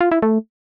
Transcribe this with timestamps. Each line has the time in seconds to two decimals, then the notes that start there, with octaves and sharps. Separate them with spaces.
0.01 F4
0.12 E4
0.22 A3